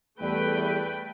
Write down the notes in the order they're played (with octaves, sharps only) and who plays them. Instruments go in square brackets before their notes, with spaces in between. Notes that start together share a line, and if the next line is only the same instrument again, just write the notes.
[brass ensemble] E2 G3 [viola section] A3 B4 G5